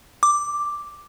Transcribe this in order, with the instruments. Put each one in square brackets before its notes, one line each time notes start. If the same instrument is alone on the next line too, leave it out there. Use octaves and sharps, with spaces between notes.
[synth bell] D6